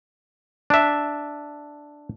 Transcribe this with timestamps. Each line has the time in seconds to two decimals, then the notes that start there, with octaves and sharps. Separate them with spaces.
0.70 D4 E5